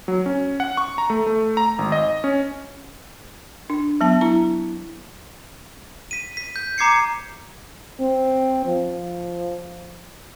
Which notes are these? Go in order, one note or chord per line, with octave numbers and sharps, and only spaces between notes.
F#3
C#4
F#5
C#6
A#5
A3
A3
A#5
G#1
D#5
C#4
D4
F#3 B3 A5
E4 A#5
B6 D#7
B6
G6
A#5 D6 G#6 C7 C#7
C4
F3